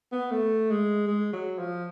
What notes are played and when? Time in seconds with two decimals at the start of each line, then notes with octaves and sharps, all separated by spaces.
0.12 B3
0.31 A3
0.70 G#3
1.07 G#3
1.33 F#3
1.58 F3